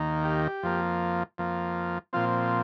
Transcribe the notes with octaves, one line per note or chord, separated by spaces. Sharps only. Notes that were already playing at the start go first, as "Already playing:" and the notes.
Already playing: D#2 D#3 A#3
G4
F2 F3 A#3
F2 F3 A#3
A#2 F3 C4 F4